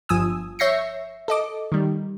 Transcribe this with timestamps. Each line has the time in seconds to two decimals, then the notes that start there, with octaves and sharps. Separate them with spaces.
0.09 G1 F3 G#5 D#6 E6
0.59 C#5 E5 G6 A#6 C7 C#7
1.28 A4 D#5 D6
1.72 D#3 G3